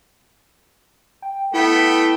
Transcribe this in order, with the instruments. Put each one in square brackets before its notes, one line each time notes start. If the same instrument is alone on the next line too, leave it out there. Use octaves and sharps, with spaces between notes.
[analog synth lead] G5
[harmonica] A3 B3 G5 [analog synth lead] E4